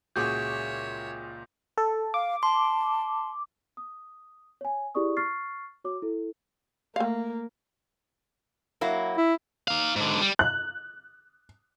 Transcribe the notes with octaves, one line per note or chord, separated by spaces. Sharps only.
C#2 A#2 F#4 G#4 C#5 E5 D6 G6
A4
F5 D6
A5 C6
D#6
C#5 G#5
E4 G4 G#4 D5 C#6 D#6
C#6 F6 A6 C7
F#4 C#5 D6
E4 A4
A3 A#3 F5
F#3 A#3 E4
E4
D#4 F5
G#2 D3
G3
F#6